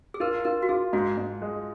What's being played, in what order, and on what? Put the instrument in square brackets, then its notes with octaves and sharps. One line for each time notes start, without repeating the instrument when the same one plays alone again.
[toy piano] G#4
[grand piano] F4 [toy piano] A#4
[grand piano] F4 [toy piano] A#4
[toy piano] F#4
[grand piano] F4 [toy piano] G#4
[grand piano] G#2 [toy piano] F#4
[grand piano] G#2
G#3